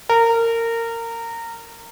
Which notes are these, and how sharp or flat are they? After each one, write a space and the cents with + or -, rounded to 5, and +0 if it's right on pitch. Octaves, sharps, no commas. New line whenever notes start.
A#4 -20